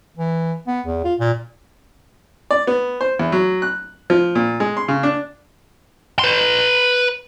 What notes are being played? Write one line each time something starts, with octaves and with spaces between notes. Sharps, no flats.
E3
B3
E2
F4
A#2
D5
B3
C5
E2
F#3
F#6
F3
A#2
G#3
C6
C#3
D4
B4 C6